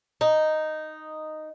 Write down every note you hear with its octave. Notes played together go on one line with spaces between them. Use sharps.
D#4